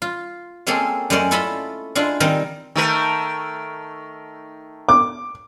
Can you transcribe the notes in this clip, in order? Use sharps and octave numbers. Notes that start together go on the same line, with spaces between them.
F4
G#3 A#3 C4 C#4 G#4 A4
F#2 G#3 A3 C#4 D5
E4 F4 A4 D#5 A5 B5
G#3 D4 E4 F4
D#3 G3 C4 A#4 D#5
D#3 A3 A#4
D6